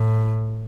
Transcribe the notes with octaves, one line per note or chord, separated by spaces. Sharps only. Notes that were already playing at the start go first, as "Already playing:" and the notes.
Already playing: A2